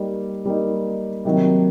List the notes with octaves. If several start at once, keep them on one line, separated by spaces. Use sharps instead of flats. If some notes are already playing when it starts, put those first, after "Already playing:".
Already playing: G3 A#3 D#4
G3 A#3 D#4
C3 D#3 F#3 A#3 D#4